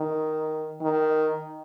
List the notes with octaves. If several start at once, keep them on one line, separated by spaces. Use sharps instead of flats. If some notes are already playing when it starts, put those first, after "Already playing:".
Already playing: D#3
D#3